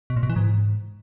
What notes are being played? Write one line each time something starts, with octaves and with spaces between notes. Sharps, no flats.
B2
A#2
B2
E3
G#2